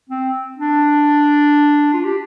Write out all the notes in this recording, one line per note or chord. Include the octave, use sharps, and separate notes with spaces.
C4
D4
F4
G4